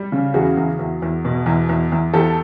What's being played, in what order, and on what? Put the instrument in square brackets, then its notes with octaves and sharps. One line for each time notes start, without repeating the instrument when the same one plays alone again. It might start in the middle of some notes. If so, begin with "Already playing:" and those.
Already playing: [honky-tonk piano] G3
C#3
E2 F#4 G#4
E2
E2
E2
B2
E2
E2
E2
E2 G4 A4